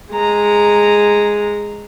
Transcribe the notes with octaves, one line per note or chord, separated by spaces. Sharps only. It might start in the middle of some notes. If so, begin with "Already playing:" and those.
G#3 A#5